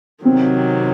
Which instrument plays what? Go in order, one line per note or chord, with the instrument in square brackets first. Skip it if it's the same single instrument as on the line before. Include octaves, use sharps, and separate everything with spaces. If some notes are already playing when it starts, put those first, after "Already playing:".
[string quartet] C3 D#3 F#3 [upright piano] C4